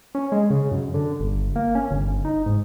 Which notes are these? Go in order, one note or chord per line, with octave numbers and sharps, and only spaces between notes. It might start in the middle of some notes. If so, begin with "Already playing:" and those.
C#4
G#3
C#3
F#2
D3
G1
A#3
C#4
G1
D#4
G#2